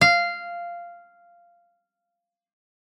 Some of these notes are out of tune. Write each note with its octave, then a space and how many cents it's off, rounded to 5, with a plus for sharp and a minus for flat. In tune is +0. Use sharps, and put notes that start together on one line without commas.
F5 -10